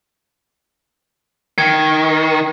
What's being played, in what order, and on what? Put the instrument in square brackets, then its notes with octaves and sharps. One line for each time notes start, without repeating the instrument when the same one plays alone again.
[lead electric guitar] D#3 [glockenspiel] G#6